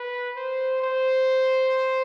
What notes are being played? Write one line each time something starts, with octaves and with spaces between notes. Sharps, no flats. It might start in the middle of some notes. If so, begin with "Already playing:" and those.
Already playing: B4
C5
C5